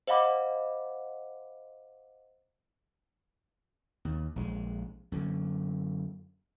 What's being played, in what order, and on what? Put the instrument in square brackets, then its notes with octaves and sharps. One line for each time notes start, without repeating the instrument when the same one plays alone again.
[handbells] C5 D#5 F5 F#5 B5 D6
[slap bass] D#2
A#1 F3 G#3
F#2 D3